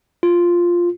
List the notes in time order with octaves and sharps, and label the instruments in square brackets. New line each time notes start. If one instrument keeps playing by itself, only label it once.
[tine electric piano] F4